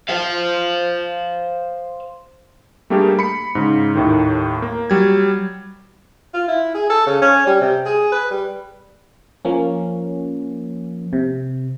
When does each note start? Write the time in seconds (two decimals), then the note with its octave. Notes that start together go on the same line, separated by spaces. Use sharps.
0.09 C5 F5
2.90 G3 A3 A#3 D4 G4 G#4
3.19 B5 C#7
3.55 G#2 C#3
3.95 D#2 A2 D#3
4.62 A#3
4.90 F#3 G3 G#6
6.34 F4
6.48 E4
6.75 G#4
6.90 A4
7.06 C#3
7.22 C#4
7.47 G3
7.61 C3
7.86 G#4
8.12 B4
8.31 G3
9.45 F3 A#3 C#4
11.13 C3